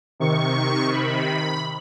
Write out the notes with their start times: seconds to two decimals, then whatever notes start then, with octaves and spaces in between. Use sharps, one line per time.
0.20 C3 D#3 C#6
0.93 B5